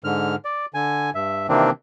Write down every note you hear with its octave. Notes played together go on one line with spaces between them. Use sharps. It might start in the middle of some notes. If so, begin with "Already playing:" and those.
G#2 D3 F6
D5
D3 G#5
G2 E5
C3 D#3 E3 A#3 C4 D4